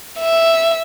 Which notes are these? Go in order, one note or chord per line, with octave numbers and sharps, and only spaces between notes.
E5